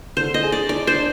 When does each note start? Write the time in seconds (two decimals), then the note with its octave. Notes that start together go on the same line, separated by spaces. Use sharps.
0.17 D3 C5
0.34 D#5
0.43 G#4
0.52 D5
0.69 D4 D5
0.87 C5
0.96 D4